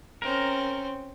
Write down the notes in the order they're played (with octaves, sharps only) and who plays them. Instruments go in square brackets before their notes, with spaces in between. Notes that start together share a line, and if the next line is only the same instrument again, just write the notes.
[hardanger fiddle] C4 C#4 [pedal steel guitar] A#4